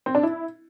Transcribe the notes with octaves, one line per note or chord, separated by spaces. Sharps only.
C4
D4
E4